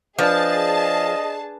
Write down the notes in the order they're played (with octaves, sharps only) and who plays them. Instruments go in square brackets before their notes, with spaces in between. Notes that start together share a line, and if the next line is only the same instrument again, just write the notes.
[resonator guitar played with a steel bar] F3 [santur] D4 B4 E6 [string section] G#4 A5 [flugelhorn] D#5